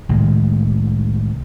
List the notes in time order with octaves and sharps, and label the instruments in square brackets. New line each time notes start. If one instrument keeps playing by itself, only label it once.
[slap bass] C2 A2 D#3 G#3